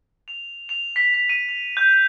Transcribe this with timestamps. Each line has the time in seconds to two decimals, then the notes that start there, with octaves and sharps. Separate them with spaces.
0.28 F7
0.69 F7
0.96 B6
1.14 B6
1.29 D#7
1.49 F7
1.77 G6